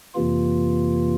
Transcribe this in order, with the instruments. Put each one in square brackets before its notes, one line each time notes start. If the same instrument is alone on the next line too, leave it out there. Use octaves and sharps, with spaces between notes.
[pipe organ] F2 C3 E3 A#3 F4